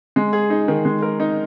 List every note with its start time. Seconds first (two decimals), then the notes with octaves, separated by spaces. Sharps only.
0.16 G#3
0.33 G#4
0.50 D#4
0.68 D#3
0.85 G#3
1.02 A#4
1.20 D#4